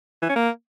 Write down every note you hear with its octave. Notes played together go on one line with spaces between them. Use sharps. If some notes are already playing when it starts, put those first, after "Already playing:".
E3
C#4
A#3